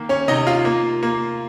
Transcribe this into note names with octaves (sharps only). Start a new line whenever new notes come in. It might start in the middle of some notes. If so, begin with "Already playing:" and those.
Already playing: D#3 A#3
C#4 C#5
C3 D#4 D#5
F4 F5
A#3
A#3